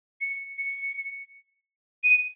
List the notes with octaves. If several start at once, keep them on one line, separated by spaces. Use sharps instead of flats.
C#7
C#7
D#7